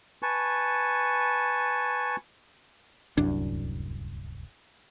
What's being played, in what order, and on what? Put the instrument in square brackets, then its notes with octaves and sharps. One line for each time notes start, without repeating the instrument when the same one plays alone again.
[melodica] B4 G#5 A5 C#6
[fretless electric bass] D1 C2 F#2 D4